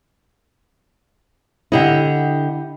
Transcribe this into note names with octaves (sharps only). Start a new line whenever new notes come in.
D3 E4 G4 D#5 F#5